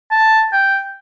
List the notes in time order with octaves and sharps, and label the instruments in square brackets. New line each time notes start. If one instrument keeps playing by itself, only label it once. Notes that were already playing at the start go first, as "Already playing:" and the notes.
[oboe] A5
G5